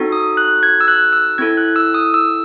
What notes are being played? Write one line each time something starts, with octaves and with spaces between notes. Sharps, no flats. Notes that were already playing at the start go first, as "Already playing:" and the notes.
Already playing: C4 D#4 F#4 A4
D#6
F#6
G#6
E6
F#6
E6
C4 E4 A4 G#6
F#6
E6
D#6
E6